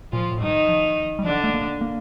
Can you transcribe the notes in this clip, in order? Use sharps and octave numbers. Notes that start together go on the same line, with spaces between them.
A#2 F3 F4
A2
G2 D#3 D#4
F3
G3
D3 F3 D4
A3
A#3
A#3